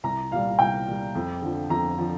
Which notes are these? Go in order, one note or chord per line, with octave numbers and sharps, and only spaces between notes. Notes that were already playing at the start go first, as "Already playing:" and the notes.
C2 A#5
A#2 G3 F5
C2 G5
A#2 G3
F2
D3 F3
F2 A#5
D3 F3